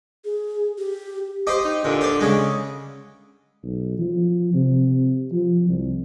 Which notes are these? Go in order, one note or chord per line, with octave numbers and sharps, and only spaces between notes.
G#4
G4
G4 C5 D#5
D#4
A#2 D3
C5 D5
C#3 G#3
B1
F3
C3
F3
C2